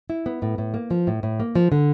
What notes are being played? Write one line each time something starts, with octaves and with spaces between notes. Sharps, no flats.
E4
B3
A2
A2
A#3
F3
A2
A2
A#3
F3
D3